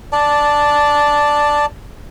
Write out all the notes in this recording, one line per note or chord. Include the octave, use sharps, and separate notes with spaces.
D5 A5